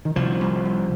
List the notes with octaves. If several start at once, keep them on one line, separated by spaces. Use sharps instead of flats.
D#3
C2 F3
C2
C2